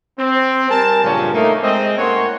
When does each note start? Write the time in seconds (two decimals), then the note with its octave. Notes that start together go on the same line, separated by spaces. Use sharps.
0.19 C4
0.70 G3 A#4 G#5 A5
1.04 G2 A#2 C#3 F3 F#3 C#4
1.34 A3 A#3 D#4
1.63 G#3 C4 D#5
1.99 A2 A#3 C#4 C#5 F#5 C6